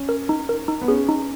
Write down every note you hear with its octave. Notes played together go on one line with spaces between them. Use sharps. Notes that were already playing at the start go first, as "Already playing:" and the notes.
Already playing: C#4
A#4
D#4
A#4
D#4
B3
C#4 G#4
D#4